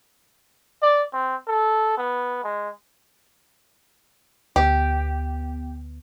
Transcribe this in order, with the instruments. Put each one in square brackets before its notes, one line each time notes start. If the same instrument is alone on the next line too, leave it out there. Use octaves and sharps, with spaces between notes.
[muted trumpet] D5
C4
A4
B3
G#3
[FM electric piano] D2 B3 [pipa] G4